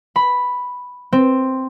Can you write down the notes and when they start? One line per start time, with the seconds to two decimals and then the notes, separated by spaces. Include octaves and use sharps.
0.16 B5
1.12 C4